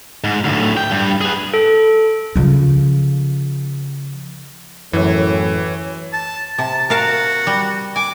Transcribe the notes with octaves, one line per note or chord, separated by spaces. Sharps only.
G#2
D2 A2
G5
G2
G#4 B4
A4
C#3 F3
F#2 A2 E3 C#5
A5
C3 A5
F#4 A#4 F5 A5
G3
G#5 D6